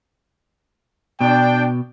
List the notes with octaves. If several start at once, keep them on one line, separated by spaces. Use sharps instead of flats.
B2 D4 G5